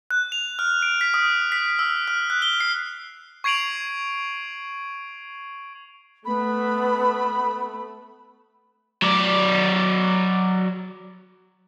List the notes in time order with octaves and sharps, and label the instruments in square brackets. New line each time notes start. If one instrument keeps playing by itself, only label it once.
[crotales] F#6
F7
F6
D7
B6
D#6
B6
E6
F6
F#6
G7
C7
C#6 G#6 C7 D7 F7 F#7
[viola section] A3 [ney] B3 [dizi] B5
[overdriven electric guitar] F#3 D5